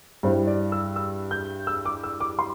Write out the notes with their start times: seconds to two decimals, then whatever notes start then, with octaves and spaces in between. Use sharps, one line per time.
0.23 G2 G3 E4 C5
0.47 D5
0.72 E6
0.96 E6
1.31 G6
1.67 E6
1.85 D6
2.04 E6
2.20 D6
2.39 C6